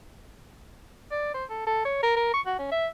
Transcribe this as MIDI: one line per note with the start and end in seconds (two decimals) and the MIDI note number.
1.11 1.34 74
1.34 1.44 72
1.49 1.63 69
1.67 1.80 69
1.85 2.00 73
2.03 2.15 70
2.16 2.32 70
2.34 2.41 85
2.46 2.55 66
2.59 2.68 61
2.72 2.87 76